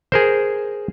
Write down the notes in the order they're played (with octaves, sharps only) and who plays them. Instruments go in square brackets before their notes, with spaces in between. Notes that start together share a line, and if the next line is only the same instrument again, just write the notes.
[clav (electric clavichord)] G#4 A#4 C5